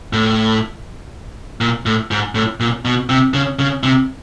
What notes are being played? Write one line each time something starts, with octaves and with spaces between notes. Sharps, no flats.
A2
A#2
A2
G#2
A2
A#2
B2
C3
C#3
C#3
C3